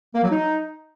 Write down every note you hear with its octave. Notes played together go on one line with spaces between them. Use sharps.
A#3
F#3
D#4